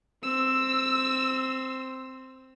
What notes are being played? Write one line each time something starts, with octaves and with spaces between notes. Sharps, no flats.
C4 E6